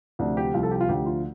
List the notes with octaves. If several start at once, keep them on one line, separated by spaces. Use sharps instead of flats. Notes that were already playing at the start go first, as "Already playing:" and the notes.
D2 C3 F3 D4
G4
C2 C3 F3 F4
A4
G4
F4
D2 D3 F3 G4
F4